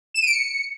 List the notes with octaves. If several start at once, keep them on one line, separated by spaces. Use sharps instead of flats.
E7
D#7
D7
C#7